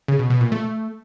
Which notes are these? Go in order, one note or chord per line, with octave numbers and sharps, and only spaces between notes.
C#3
B2
B2
A#2
A3